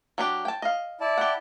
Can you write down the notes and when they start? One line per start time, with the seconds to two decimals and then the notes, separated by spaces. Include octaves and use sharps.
0.18 F#3 D4 G4
0.45 G5 A5
0.62 D#5 F5
1.01 E4 D5 A5
1.18 G4 F#5